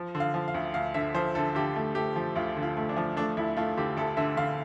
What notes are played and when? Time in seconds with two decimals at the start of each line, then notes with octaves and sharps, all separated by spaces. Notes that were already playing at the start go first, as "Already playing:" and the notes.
Already playing: F3
0.15 D3
0.20 F5
0.34 F3
0.48 F5
0.54 D2
0.74 D2 F5
0.94 D3 E5
1.14 F3 C5
1.35 D3 A4
1.55 D3 G4
1.76 A3
1.95 A3 G4
2.16 F3
2.35 D2 F4
2.56 D3
2.63 F4
2.77 A3
2.89 D4
2.96 F3
3.17 A3 D4
3.37 D2 E4
3.57 A3 F4
3.77 D3 G4
3.97 D2 A4
4.17 D3 E5
4.37 D3 F5